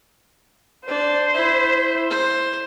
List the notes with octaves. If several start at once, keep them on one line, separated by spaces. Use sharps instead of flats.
D4 C5
E4
C5